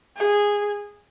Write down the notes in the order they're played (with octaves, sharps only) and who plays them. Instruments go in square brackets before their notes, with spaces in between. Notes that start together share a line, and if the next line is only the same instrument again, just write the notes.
[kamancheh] G#4